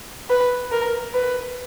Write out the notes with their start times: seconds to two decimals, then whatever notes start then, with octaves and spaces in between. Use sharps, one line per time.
0.30 B4
0.72 A#4
1.14 B4